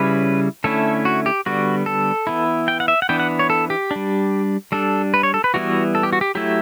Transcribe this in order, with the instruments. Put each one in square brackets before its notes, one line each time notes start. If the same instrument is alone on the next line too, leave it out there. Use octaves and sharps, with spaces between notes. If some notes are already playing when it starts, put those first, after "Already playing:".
Already playing: [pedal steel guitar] C#3 G3 C#4 E4 B4
D3 A3 C#4 E4 A4
F#4
G4
D3 G3 B3 F#4
A4
E3 B3 E4
G5
F#5
E5
F#5
E3 B3 D4 G5
F#5
C#5
A4
G4
G3 D4
G3 D4 A4
B4
C#5
A4
B4
E3 G3 B3 E4 F#4
A4
G4
F#4
G4
F#3 A3 E4 G4